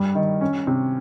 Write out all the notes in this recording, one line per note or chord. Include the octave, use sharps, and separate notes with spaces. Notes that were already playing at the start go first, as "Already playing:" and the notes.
Already playing: G2 G3
D#3
C#4
C3